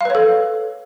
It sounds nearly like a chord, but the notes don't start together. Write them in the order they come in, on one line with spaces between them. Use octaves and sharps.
F5 B4 C#5 A4